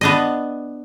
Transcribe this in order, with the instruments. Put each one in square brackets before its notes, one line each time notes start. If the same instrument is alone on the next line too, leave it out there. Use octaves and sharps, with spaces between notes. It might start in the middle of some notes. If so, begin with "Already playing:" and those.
[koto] B3 D4 D#5